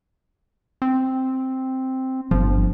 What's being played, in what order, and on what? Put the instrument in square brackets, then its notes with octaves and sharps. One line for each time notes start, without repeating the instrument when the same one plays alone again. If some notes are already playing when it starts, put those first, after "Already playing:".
[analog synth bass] C4
[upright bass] G1 [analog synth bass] F3